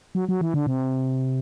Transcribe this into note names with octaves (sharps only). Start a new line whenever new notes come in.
F#3
F#3
E3
D3
C3